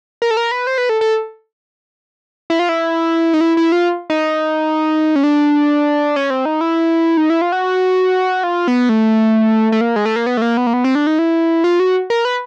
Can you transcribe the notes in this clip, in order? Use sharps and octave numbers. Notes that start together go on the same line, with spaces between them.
A#4
A4
A#4
B4
C5
B4
A4
A4
E4
F4
E4
D#4
E4
E4
F4
D#4
C#4
D4
C#4
C4
D#4
E4
D#4
E4
F4
F#4
F4
B3
A3
A3
A#3
G#3
A3
A#3
B3
A3
A#3
B3
A#3
B3
C4
D4
D#4
E4
F4
F#4
A#4
B4